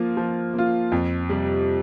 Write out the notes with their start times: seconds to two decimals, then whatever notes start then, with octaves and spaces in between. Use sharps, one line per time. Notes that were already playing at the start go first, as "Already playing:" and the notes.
Already playing: F3 A#3 F4
0.17 F3
0.54 A#3 F4
0.92 F2
1.30 C3 G3